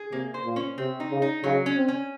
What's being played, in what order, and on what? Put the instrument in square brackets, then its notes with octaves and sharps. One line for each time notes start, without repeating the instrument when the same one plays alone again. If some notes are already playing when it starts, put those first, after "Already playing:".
Already playing: [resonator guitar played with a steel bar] G#4
[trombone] C3 [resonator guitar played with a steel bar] A#3
[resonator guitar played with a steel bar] C5
[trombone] A#2
[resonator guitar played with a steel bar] C#4
[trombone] C3 [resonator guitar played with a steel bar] C4
[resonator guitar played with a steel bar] D#4
[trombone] C#3
[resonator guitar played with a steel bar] D#4
[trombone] C#3 [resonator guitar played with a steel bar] F#3
[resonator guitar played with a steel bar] C#4
[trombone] C4
[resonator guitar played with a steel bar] C#4